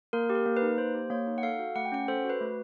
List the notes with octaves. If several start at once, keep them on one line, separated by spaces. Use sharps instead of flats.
A#3 A#4
G4
A#4
A#3
B4
D#4
A#3 C5
G4
A#3 C#5
D#4
F#5
A4 F5
F#4
A3 F#5
G5
C#4 F#5
A4 C5
F#4
B4
A3